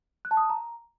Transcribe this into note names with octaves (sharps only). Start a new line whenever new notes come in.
F#6
A5
D#6
A5
A#5